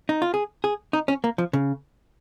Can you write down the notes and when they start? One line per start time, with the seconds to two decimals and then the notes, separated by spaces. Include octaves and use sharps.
0.09 D#4
0.22 F4
0.34 G#4
0.64 G#4
0.93 D#4
1.08 C#4
1.24 A#3
1.38 F3
1.53 C#3